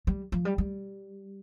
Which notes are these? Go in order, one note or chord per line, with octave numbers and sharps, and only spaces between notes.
G3
F3
G3
G3